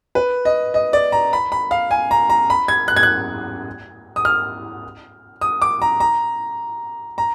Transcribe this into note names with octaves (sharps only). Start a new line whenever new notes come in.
B4
D#5
D#5
D5
A#5
B5
B5
F5
G#5
A#5
A#5
B5
G#6
F#6
G#6
F#6
D#6
F6
D#6
D6
A#5
A#5
A#5